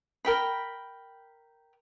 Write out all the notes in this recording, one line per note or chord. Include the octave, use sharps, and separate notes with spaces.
A#4 G5 B5